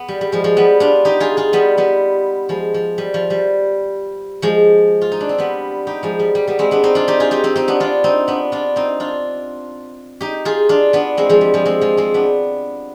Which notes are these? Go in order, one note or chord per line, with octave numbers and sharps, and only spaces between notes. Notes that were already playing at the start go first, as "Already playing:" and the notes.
Already playing: B3
G3
G3
F3 G#3
F3 G#3
G3 B3
D4 F4
D#4 G4
F4 G#4
F4 G#4
G3 B3
G3 B3
F3 G#3
F3
G3
F3
G3
F3 G#3
F4
D#4
D4
C4
G3 B3
D#4 G4
F3 G#3
G3
G3
G3 B3
G#3 C4
B3 D4
C4 D#4
D4 F4
D#4 G4
F4 G#4
D#4 G4
C4 D#4
C4 D#4
B3 D4
D4 F4
C4 D#4
B3 D4
D4 F4
C4 D#4
D4 F4
D#4 G4
F4 G#4
D4 F4
B3 D4
G#3 C4
F3 G#3
G3
F3 G#3
G#3 C4
F3 G#3
G#3 C4
B3 D4